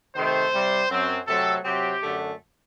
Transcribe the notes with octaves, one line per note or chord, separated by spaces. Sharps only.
C3 D#3 A3 C5
C3 G3 C4
F#2 F#3 C4
C3 F#3 A3 C4 A4
C3 F#3 C4 G4
F#2 D3 A3